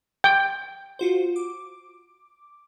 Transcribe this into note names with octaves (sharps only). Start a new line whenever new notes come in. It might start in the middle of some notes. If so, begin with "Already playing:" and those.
G5
F4 F#4 C5
D6